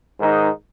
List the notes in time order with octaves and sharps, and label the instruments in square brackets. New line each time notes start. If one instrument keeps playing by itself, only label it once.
[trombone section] G#2 D#3 G#3 D#4